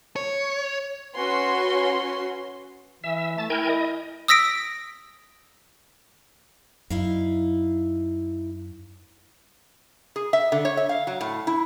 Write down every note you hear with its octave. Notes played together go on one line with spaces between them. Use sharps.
C#5
C#4 F#4 B4 C#5 C6
E3 E5
A3 A5
E4 A#4 G5 G#5
D#5
D#6 E6 A#6 B6 D7
F#2 D#4 E4 F5
G#4
E5
D3
C#5
E5
F5
F#3
A2
E4